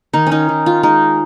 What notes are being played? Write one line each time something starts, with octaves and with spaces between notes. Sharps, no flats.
D#3 D#4
C#4
D#4
D#3
F4
G#3 D#4